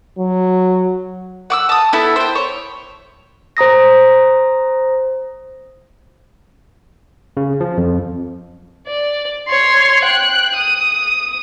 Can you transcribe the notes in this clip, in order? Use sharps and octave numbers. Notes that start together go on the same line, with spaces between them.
F#3
F#5 D6 E6
A5 D#6
B3 E4 A4
C5 G5
C#5
C5 A#5 D#6 A#6
C#3
F3
F2
D5
C#5 C6
G5 F#6
D#6